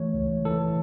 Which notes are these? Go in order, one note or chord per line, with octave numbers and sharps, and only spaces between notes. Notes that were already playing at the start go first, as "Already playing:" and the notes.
Already playing: E3 A3 C#5
C#2
E3 A4